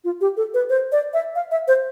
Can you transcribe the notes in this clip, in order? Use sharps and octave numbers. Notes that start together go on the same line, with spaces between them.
F4
G4
A4
B4
C5
D5
E5
F5
E5
C5